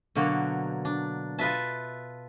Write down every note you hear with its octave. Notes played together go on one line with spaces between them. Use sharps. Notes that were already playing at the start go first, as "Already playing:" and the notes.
B2 D3 F#3 A#3 F#4
D4
F4 A4 B4 D#5 E5 A5